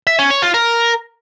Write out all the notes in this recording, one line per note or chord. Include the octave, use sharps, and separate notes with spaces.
E5
C#4
C#5
F4
A#4